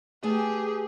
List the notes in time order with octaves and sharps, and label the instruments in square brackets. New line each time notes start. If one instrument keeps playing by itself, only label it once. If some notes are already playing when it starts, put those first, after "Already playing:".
[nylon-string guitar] A3 B3 G#5 [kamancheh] G4 G#4